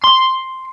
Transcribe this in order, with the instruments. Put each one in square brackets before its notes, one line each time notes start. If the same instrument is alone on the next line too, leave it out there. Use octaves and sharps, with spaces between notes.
[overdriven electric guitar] C6